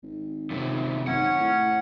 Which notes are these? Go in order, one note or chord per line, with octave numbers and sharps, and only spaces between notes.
G#1
F#2 C3
G#1 C#4 F#5
A2